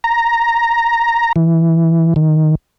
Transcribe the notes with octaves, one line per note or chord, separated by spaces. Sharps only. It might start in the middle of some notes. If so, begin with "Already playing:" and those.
A#5
E3
D#3